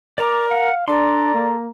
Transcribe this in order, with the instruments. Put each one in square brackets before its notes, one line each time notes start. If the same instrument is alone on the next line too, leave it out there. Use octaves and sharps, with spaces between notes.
[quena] A#4 [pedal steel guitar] D5 A#5 D6
[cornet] F5 [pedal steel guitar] F#5
[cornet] D4 [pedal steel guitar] A4 C6 [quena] D5 [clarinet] A#5
[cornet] A#3